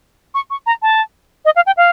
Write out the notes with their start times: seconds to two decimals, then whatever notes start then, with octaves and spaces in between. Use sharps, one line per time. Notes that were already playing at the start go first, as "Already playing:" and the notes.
0.34 C#6
0.50 C#6
0.66 A#5
0.82 A5
1.45 D#5
1.56 F5
1.66 G5
1.77 F5